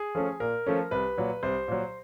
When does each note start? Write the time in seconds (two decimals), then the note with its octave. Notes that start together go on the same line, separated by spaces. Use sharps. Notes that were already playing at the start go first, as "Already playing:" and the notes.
Already playing: G#4
0.15 F3 A3 C#4
0.40 A#2 A#4
0.67 F3 A3 C#4
0.91 C2 B4
1.17 A#2 F#3
1.43 C2 C5
1.68 A#2 F#3